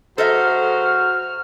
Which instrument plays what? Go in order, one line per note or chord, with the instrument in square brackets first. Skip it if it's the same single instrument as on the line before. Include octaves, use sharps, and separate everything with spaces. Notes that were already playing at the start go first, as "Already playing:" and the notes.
[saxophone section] F#3 G#4 C5 [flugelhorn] F#4 [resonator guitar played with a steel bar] A4 D#5 E5 [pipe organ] F6